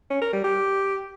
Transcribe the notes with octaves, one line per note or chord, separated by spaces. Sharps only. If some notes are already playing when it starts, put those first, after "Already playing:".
C#4
A#4
G3
G4